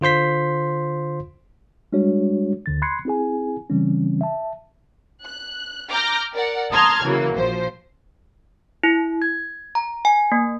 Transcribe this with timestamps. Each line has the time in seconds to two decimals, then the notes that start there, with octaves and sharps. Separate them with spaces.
0.01 D3 F4 C5 C6 B6
1.93 G3 G#3 D4 F#4 C#5
2.66 D2 D3 A6
2.82 B5 C6 F#6 G#6 C7 C#7
3.05 C4 E4 G#4 G#5
3.70 C#3 E3 G3 C4 C#4
4.21 E5 A5
5.24 F#6
5.90 A#5 D6 F6 G6 A#6
6.33 A#4 D5 F#5
6.73 A5 A#5 C6 D#6 F6 G#6
7.03 C#3 E3 F#3 A#3
7.34 A#1 F3 C5
8.83 E4
9.22 G#6
9.75 A#5
10.05 G#5
10.32 A#3